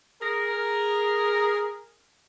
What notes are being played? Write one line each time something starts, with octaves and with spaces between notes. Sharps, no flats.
G#4 A#4